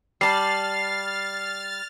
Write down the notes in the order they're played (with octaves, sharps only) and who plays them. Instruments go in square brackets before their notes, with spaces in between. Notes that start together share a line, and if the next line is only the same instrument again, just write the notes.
[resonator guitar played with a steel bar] G3 [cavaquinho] D5 A5 [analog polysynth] F6 A6 [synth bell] C7